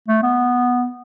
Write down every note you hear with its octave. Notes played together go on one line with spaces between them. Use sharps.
A3
B3